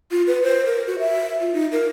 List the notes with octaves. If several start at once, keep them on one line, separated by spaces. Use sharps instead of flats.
F4
B4
C5
A#4
F#4
E5
F4
D#4
A#4